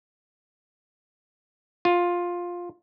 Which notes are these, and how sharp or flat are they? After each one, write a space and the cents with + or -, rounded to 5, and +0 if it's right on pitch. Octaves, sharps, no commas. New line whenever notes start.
F4 +10